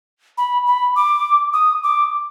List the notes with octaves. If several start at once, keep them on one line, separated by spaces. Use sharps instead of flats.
B5
B5
D6
D#6
D6